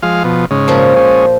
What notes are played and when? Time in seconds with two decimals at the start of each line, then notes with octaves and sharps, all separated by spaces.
0.03 F3 G#3 F5
0.24 B2 F3
0.51 G#2 C#3
0.68 A#2 F3
0.96 G#3 C#4